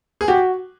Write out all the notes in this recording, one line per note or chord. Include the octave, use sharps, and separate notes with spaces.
G#4
F#4 G4